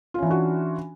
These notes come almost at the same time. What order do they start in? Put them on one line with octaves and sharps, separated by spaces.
F4 C#4 E3 D4 F#4